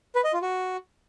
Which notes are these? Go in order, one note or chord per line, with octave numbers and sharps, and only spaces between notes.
B4
D#5
F4
F#4